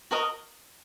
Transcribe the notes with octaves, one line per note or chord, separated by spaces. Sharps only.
F#4 A#4 D#5